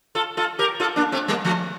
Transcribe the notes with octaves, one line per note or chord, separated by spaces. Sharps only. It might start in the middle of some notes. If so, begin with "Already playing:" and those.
F4 A4
F4 A4
G4 A#4
F4 A4
A#3 D4
A3 C4
G3 A#3
F3 A3